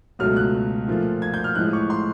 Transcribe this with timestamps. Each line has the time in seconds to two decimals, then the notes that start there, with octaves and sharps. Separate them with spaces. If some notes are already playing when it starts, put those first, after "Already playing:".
0.19 C#2 B2 F#3 A3 F6
0.36 F#6
0.88 A#2 F3 A3
1.22 G#6
1.34 G6
1.44 F6
1.55 A2 F3 G#3 F#6
1.73 C#6
1.90 C6